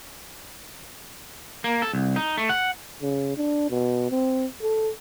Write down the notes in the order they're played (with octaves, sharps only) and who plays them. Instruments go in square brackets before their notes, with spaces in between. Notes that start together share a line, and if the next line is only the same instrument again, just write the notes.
[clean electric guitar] A#3
A4
C2
D#4
A3
F#5
[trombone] C#3
D4
B2
C4
A4